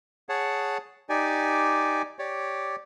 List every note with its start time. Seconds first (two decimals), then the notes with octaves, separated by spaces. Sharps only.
0.29 G#4 C#5 F#5 A5
1.09 D#4 G4 D5 G#5
2.19 G4 C#5 D5